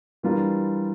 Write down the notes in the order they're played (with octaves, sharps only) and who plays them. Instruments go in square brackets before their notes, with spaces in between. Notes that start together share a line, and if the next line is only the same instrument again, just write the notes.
[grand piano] E3 G3 D4 F4 A#4